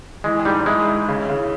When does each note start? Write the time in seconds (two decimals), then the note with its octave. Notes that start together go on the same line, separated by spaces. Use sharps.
0.24 E3 G#3
0.45 G#2 G3
0.66 G#3 E4
0.88 E4
1.08 C#3
1.30 C#3